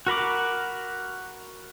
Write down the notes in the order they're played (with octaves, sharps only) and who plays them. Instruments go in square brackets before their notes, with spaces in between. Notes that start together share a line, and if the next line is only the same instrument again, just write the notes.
[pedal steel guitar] F#4 A#4 B5 D6